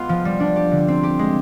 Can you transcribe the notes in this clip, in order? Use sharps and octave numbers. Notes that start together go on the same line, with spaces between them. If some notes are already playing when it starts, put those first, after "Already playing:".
Already playing: G#3 B3 F4
F3
G3
D4
G4
D3
C4
G4
G#3